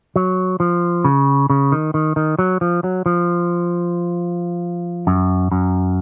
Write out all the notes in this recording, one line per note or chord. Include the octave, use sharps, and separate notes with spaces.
F#3
F3
C#3
C#3
D#3
D#3
D#3
F#3
F3
F#3
F3
F#2
F#2